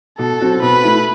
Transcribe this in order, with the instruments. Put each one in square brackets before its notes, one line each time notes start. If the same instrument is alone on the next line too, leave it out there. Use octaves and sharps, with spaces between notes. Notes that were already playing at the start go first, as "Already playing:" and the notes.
[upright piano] B2 [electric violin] A4
[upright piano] F#3 C4 F#4
[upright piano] B2 [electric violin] B4
[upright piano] A3 E4